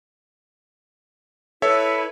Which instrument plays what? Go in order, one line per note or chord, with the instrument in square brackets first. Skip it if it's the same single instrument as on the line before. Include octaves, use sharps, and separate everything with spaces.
[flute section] E4 B4 [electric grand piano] A4 C#5 E5